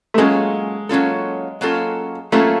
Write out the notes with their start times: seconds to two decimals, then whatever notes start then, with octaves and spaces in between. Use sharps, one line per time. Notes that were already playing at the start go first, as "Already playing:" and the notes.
0.14 A3
0.18 F#3 G#3 A#3 C#4 F4 A4
0.89 F#3 A#3 C#4 F4 A4
1.61 F#3 A#3 C#4 F4 A4
2.32 F#3 A3 A#3 C#4 F4 A4